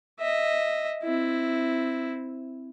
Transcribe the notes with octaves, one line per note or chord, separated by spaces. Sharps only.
D#5 E5
C4 E4